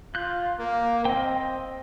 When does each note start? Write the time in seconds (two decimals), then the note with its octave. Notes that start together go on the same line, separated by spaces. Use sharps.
0.15 F4 F#6 G6
0.59 A#3
1.05 C4 D#5 G5